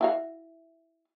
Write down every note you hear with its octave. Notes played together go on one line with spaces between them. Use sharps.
E4 F#4 F5